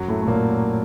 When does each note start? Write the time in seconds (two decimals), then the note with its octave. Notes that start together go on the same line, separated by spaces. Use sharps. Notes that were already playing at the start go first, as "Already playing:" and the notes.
Already playing: F#2 F#3
0.08 A2 A3
0.22 A3
0.27 A#2 A#3